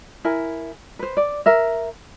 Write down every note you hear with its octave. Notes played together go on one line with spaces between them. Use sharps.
E4 A#4 G#5
B4 C5
D5
A#4 E5